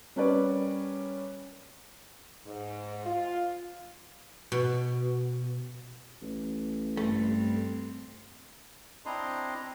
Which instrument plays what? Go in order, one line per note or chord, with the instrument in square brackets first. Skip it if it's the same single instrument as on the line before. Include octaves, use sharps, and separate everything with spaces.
[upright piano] G3 C#4 A#4 B4 C#5 D5
[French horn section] G#2
F4
[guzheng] B2
[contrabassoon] A1
[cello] G2 C4 [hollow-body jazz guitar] A3
[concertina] C4 D4 E4 D#5 A#5 C6